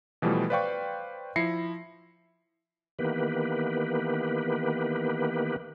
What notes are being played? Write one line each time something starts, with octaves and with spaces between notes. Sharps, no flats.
B2 E3 F3 G3 A3
B4 C5 D5 F5 G5 C#6
F3 E4 A#6 C7 C#7
D#3 E3 A#3 B3 G4 B4